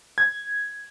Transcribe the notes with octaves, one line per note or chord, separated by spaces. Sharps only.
G#6